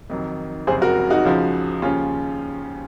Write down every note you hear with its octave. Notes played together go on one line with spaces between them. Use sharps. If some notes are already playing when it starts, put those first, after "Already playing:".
F2 D#3 F#3
F#1 F2 C3 G#4 C5
F#4 A#4
D#4 F#4
C#2 C#3 F3
D#2 C#3 F3 C#4 F4